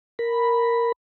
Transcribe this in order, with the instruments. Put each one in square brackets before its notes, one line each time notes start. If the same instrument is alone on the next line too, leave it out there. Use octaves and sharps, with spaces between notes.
[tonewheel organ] A#4 B5